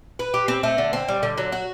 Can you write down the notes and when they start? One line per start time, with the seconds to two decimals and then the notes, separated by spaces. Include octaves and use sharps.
0.19 B4
0.34 G4
0.48 C4
0.63 A3
0.78 D3
0.93 C4
1.08 G3
1.23 D3
1.38 F#3
1.52 F#4